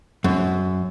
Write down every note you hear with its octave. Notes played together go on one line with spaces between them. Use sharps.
F#2